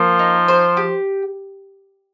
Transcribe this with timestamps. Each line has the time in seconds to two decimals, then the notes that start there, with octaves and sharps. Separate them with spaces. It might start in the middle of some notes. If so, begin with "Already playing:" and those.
Already playing: F3 A#3
0.19 D#4
0.48 C5
0.77 G4